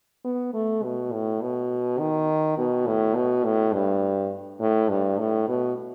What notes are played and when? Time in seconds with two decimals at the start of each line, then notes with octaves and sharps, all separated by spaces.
0.25 B3
0.54 A3
0.83 B2
1.12 A2
1.41 B2
1.99 D#3
2.58 B2
2.87 A2
3.15 B2
3.44 A2
3.73 G2
4.60 A2
4.89 G2
5.18 A2
5.48 B2